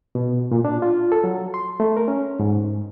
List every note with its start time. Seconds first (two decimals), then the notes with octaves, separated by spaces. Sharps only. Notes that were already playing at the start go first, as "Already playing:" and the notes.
0.15 B2
0.52 A#2
0.65 D4
0.82 F4
1.12 A4
1.24 F#3
1.54 C6
1.80 A3
1.97 A#4
2.08 C#4
2.40 G#2